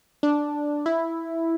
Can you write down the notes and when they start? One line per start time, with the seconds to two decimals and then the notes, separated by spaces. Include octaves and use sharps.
0.23 D4
0.86 E4